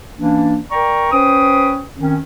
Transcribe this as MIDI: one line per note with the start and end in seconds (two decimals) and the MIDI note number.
0.17 0.58 52
0.17 0.58 58
0.17 0.58 61
0.17 0.58 62
0.72 1.08 70
0.72 1.08 74
0.72 1.08 79
0.72 1.08 82
0.72 1.08 85
1.12 1.80 61
1.12 1.80 71
1.12 1.80 72
1.12 1.80 79
1.12 1.80 87
1.98 2.16 51
1.98 2.16 60
1.98 2.16 61